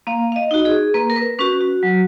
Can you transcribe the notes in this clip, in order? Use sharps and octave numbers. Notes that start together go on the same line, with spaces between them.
A#3 F5
F5
D#5
D#4 F#4
G#4
A#3 B4
A#4
B4
C#4 F#4 B4
F#4
F#3